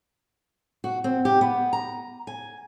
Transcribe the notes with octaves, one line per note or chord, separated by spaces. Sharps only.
F#4
C4
G4
B3
A#5
G#5